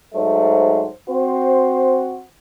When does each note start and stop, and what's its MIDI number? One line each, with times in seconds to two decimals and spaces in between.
0.14 0.86 44
0.14 0.86 54
0.14 0.86 57
0.14 0.86 72
1.08 2.21 60
1.08 2.21 66
1.08 2.21 72